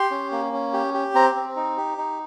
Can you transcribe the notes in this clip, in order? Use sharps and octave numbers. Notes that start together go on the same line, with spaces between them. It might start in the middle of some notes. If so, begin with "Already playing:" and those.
Already playing: G4 C6
C#4
A#3
C#4
G4
G4
C4 A#5
C4
D#4
G4
D#4